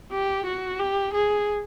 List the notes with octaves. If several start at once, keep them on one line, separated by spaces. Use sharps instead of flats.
G4
F#4
G4
G#4